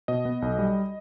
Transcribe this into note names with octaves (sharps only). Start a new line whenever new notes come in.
B2 D#5
B3
B1
G3